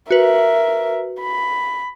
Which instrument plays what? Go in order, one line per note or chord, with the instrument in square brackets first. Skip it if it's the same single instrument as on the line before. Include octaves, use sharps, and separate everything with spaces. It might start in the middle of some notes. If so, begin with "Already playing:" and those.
[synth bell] F#4 B4 [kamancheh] A#4 E5
[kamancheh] B5